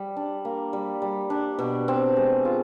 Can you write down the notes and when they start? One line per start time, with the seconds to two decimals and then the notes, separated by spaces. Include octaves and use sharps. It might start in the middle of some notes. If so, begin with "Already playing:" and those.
Already playing: G3
0.17 D4
0.45 A#3
0.73 G3
1.02 G3
1.30 D4
1.59 B2
1.88 C4
2.16 G#3
2.45 F4